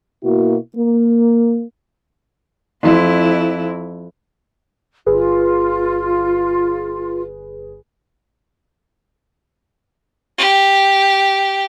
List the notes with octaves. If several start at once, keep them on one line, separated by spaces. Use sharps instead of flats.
B2 A#3 E4 F#4
A#3
F2 E4
G1 F4 G#4 B4
G4